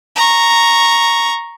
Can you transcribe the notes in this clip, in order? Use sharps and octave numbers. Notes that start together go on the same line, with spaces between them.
A#5 C#6